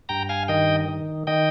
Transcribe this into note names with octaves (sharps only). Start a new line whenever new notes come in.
G2 G5 A#5
F5 G#5
D#3 D#5 G5
D#3
D#3 D#5 G5